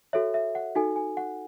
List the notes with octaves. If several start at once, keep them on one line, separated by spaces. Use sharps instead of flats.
F#4 A4 C#5 E5
E5
F#5
D#4 F#4 A4 G#5
G#5
F#5